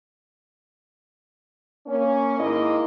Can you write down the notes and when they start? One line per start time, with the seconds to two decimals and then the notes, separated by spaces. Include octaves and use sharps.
1.87 A#3 C#4
2.39 G#2 D#3 A#3 E4 D#5